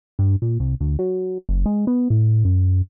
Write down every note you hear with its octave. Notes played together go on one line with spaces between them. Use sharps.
G2
A#2
C2
D2
F#3
F#1
G#3
B3
A2
F#2